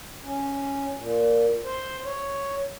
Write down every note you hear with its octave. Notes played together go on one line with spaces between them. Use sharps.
C#4
A#2
C5
C#5